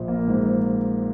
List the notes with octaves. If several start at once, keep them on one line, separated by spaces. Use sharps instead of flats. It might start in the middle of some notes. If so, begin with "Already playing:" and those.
Already playing: A#1 F3
A#3
G#2